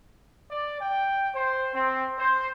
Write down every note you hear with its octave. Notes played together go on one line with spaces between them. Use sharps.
D5
G5
C5
C4
C5